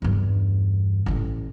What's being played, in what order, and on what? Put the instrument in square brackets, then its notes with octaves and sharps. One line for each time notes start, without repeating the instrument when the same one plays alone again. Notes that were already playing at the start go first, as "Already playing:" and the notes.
[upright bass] E2 G2
A1 A2